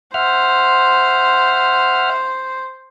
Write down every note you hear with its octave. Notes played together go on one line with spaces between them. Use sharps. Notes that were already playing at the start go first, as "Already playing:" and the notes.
C5 E5 F#5 F6